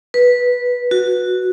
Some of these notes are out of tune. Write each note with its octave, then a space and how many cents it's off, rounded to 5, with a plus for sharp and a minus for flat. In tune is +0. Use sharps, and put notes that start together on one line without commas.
B4 -10
F#4 -5